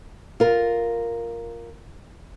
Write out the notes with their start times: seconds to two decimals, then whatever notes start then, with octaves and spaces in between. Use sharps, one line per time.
0.40 F4 A#4